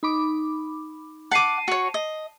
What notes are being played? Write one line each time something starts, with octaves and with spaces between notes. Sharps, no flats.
D#4 B5 D6
F#5 A5 D6 C7 D#7
F#4 C#5
D#5